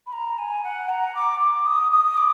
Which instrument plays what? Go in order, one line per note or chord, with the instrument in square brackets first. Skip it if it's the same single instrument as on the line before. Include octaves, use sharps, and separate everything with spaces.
[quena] B5
A#5
G#5
F#5
A#5
D6
D6
D#6
D#6
D6